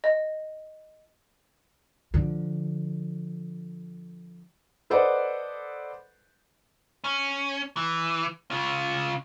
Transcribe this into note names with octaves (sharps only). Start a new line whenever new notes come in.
D#5
D3 F3
A4 B4 C5 D5 D#5 F#5
C#4
E3
C#3 F4